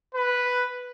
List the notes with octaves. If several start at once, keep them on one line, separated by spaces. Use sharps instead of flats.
B4